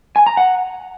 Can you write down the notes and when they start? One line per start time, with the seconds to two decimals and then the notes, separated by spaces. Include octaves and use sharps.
0.16 G#5
0.27 A#5
0.37 F#5